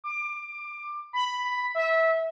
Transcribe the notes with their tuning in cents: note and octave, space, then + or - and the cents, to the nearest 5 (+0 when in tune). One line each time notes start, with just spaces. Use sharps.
D6 +25
B5 +5
E5 -20